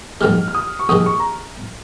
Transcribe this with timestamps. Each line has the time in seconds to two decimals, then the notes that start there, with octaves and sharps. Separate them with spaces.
0.21 A#1 G#2 D#3 G#3 F6
0.48 F6
0.54 D#6
0.79 C#6
0.89 A#1 G#2 D#3 G#3 D#6
1.06 C#6
1.20 A#5